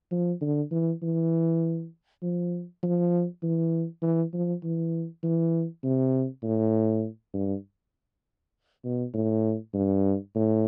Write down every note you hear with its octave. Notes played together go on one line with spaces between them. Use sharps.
F3
D3
E3
E3
F3
F3
E3
E3
F3
E3
E3
C3
A2
G2
B2
A2
G2
A2